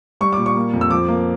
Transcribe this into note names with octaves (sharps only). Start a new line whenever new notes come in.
G3 C#6
A#2 D6
C#6
A#3
F2
E6
F3 D6
A#3